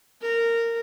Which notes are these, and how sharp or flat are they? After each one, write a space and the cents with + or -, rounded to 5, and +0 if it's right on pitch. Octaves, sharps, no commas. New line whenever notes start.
A#4 -15